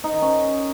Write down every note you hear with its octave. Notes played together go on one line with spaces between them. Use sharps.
D#4
D#3
C#4